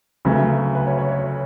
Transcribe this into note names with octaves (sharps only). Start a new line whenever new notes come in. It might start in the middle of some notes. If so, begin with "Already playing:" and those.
D2 C#3 F#3 A3 B4
B4
C#5
C#5
C#5